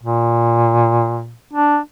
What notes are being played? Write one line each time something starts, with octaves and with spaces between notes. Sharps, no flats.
A#2
D4